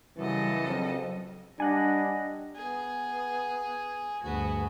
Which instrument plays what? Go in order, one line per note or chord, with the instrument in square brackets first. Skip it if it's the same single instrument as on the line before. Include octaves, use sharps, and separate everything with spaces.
[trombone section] F#2 E3 [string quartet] C#3 A4 D#5 [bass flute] G3
[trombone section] A#1 F2 [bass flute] F#3
[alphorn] G3 [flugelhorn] D4 [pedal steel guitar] D#5 F#5 G#5
[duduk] B3 [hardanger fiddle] G#4
[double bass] D2 G2 [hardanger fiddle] B3 F#4 [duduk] G#4